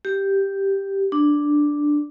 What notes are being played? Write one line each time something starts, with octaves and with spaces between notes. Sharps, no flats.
G4
D4